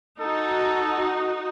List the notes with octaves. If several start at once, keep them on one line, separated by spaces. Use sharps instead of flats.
D#4 F#4 A4